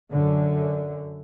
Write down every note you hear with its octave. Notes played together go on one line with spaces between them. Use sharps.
F#2 D3